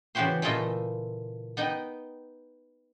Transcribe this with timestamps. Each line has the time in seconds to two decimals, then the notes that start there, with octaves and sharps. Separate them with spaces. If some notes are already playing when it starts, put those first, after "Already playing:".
0.15 C#3 E3 B3 F#4 G4 C5
0.42 A#2 E3 A3 F4 D#5 E5
1.57 B3 D#4 D#5 G5